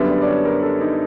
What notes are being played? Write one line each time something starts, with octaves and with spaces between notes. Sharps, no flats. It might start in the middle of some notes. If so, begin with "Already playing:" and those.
Already playing: F#2 D3 G3 B3 D4 E5
D5
D5
C#5
A#4
A4
D#4